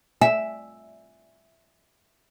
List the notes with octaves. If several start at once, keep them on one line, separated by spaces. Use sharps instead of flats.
E5 G#5